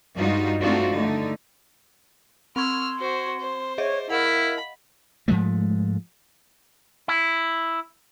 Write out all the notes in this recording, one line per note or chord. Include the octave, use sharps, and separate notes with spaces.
G2 G3 G#3 D#4 F4 F#4
A3 C4 D4 D#4 F4 F#4
D3 A3 D#4
C4 C6 C#6 E6 F6 G#6
F#4 C5
C5
G#4 C#5 D#5 E5
E4 A#4 D#5 F5 F#5 B5
G#2 F3 G#3 A3
E4